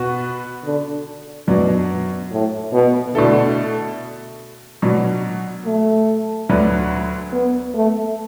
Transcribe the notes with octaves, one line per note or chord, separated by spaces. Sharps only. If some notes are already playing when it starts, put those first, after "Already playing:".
Already playing: B2 B3 F#4 B4
D3
F#2 B2 F#3 D4
A2
B2
B2 D3 A3 E4 A4
B2 F#3 D4
A3
D2 D3 F#3 D4 B4
B3
A3